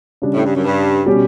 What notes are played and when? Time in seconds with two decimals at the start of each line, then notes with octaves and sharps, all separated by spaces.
0.22 C#3 G3 D4
0.33 A2
0.43 G2
0.54 F#2
0.64 G2
1.06 B2 G3 C#4 G4